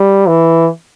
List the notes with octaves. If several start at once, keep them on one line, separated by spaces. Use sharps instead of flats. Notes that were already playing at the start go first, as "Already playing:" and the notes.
Already playing: G3
E3